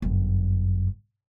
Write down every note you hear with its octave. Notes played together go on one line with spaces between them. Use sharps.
G1 F#2